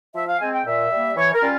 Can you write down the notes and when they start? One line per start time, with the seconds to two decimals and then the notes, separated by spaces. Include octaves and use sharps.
0.15 F3 E5
0.28 F5
0.41 G#3 C4 G#5
0.54 G5
0.66 A#2 E5
0.91 G3 A#3
1.17 E3 C#5
1.34 A#4
1.42 G3 C#4 F4